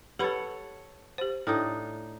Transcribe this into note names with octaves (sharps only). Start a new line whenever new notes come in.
G4 A4 B4 C#5 F#5 B5
G4 C5
A2 D4 D#4 A4